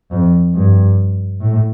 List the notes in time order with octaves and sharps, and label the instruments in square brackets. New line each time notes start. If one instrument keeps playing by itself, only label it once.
[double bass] F2
G2
A2